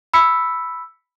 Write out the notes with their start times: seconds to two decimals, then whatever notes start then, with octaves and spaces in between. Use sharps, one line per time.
0.14 B5 E6 B6 C#7